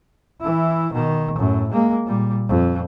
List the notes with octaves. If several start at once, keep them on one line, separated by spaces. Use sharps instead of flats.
E3 E4
B2 D#3
F#2 A2
G#3 A#3
A#2 G3
F2